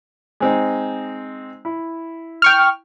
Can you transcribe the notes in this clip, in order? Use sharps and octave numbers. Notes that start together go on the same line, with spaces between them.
G#3 C4 D#4
E4
G5 C#6 F6